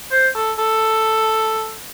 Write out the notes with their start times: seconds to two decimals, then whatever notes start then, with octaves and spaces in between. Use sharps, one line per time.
0.11 C5
0.35 A4
0.58 A4